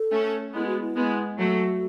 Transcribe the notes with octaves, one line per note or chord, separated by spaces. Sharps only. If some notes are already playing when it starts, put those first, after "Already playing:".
Already playing: A4
A3 C#4
G#3 B3 E4
F#4
E4
G#3 B3
F#3 A3 F#4